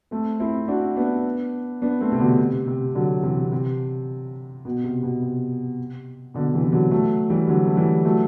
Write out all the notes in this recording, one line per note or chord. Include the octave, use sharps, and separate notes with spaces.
A3 C4
C4 E4
D4 F#4
B3 D4
B3 D4
A3 C4
C3
B2 D3
C3
C3
D3 F#3
C3 E3
C3
B2
C3
B2
C3
B2 D3
C3 E3
E3
D3 F#3
F#3 A3
E3 G3
D3 F#3
A3
E3 G3
F#3 A3